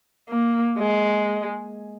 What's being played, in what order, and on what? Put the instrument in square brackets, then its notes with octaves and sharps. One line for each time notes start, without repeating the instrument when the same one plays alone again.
[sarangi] A#3
G#3